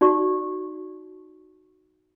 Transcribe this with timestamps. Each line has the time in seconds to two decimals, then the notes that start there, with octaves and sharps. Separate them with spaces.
0.01 D#4 F#4 D5 C#6